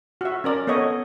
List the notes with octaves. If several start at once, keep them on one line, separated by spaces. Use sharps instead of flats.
F#4 E5
C#4 A#4 D5
B3 A4 C#5 D#5